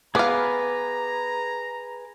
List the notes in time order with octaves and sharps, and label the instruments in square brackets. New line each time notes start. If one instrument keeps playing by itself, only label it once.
[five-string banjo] B3 F5 [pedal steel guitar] G#4 B4 D6 [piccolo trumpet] A#5